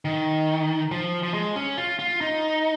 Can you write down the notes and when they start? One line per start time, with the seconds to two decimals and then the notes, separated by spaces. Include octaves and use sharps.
0.05 D#3
0.91 F3
1.23 F3
1.34 G#3
1.56 C#4
1.78 F4
1.99 F4
2.21 D#4